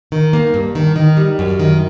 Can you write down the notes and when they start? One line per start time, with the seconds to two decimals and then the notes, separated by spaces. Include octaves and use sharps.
0.12 D#3
0.33 A#3
0.54 G2
0.75 D#3
0.96 D#3
1.17 G3
1.39 F#2
1.59 D#3